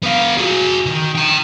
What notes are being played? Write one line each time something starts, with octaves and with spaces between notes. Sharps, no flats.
B3 F5
F#4 G#4
D#3
G5 A#5